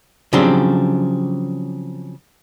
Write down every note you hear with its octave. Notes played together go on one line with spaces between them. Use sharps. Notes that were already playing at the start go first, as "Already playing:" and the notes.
C#3 F3 F#3 C4 D4 G4